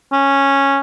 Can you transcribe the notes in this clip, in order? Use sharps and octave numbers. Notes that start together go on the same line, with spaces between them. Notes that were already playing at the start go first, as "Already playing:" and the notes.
C#4